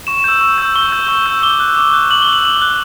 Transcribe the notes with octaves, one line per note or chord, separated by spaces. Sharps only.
C#6 E7
E6 G6
C#6
E6 G6
C#6 G7
E6 G6
C#6
E6 G6
D6 G7
F#6
D6
F#6
D6 F#7
G7
F#6 F#7
D6 F#7
F#6